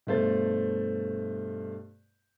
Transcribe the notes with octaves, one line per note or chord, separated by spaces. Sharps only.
G2 B2 A3 C5 A6